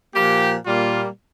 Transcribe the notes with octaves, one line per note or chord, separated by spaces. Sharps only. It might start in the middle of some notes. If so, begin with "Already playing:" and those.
A#2 F3 A#3 G4
A#2 G3 A#3 F4